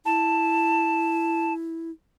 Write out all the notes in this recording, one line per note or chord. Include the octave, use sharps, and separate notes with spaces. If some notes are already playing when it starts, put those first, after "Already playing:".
E4 A5